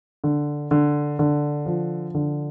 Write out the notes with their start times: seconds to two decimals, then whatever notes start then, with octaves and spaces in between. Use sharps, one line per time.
0.24 D3
0.71 D3
1.19 D3
1.66 F3
2.14 D3